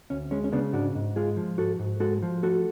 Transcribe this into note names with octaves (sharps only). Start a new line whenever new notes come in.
D2 C#4
G#3 C#4
C#4
C#3 B3 D4
G#2 D4 F#4
G#2
G#3 F4 G#4
F3
G#2 F#4 A4
G#2
G#3 F#4 A4
F3
A3 F#4 A4